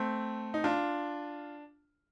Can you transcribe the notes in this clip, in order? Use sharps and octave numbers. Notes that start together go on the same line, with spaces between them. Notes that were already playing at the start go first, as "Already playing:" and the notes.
Already playing: A3 C4
D#4
D4 F4